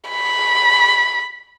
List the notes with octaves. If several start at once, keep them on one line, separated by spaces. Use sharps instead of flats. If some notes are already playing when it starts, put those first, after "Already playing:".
B5